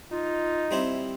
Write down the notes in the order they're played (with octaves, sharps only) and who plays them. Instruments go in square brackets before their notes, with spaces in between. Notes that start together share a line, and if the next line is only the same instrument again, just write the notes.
[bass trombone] D#4 [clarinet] F4
[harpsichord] G3 C4 E4